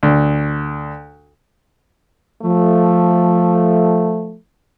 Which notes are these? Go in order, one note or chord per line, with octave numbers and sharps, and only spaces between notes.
D2
F3 A3